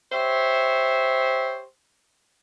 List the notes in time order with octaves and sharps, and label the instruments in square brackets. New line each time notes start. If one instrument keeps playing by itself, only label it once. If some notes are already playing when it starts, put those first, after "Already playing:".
[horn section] G4 C5 C#5 E5